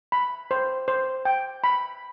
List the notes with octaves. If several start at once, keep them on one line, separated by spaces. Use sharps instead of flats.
B5
C5
C5
G5
B5